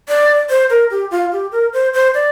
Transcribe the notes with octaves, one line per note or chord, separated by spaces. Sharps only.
D5
C5
A#4
G4
F4
G4
A#4
C5
C5
D5